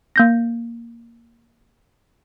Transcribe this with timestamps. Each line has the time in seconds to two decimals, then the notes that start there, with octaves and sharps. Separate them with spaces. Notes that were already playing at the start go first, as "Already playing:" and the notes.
0.16 A#3 G6 A#6